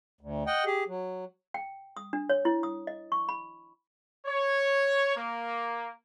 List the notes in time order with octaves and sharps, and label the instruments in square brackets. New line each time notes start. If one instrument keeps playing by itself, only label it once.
[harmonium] D2
D#5 F#5 G5
G4 G#4
F#3
[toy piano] G5
D#6
D4
C#5
E4
D#6
D#5
C#6
B5
[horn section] C#5
A#3